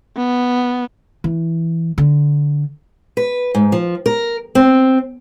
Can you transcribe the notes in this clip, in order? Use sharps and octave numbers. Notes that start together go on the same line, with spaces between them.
B3
E3
D3
B4
G#2
F3
A#4
C4